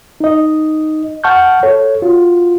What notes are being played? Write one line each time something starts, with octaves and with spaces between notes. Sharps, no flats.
D#4 D#5
F#5 A5 C#6 F6 G6
A4 C#5
F4 F#4